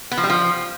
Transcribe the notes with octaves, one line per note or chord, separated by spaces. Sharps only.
B3
F3
G3
F3